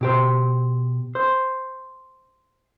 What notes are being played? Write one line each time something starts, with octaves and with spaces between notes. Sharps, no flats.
B2 G4 C5
C5